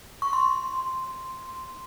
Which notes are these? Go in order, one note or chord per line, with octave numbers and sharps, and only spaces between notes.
C#6
C6